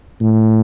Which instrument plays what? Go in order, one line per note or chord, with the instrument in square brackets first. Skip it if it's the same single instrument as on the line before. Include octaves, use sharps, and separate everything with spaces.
[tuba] A2